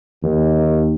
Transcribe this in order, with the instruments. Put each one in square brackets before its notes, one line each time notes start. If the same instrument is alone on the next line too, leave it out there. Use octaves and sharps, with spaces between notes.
[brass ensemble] D#2